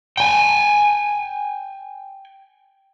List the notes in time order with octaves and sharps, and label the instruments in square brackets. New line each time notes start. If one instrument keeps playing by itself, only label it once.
[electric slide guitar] G5 G#5